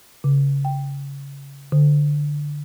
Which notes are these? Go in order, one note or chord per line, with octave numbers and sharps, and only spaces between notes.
C#3
G5
D3